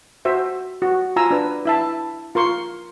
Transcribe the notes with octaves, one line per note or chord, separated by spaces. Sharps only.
F#4 C5 E5
F#4
F4 G#5 A#5 E6
D4 B4
E4 E5 A5
F4 A#4 C6 C#6